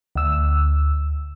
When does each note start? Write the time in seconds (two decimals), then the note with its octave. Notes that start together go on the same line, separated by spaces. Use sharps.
0.15 D2 E6